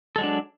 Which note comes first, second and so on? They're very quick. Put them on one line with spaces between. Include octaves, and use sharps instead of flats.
A4 G#3 F#3 D4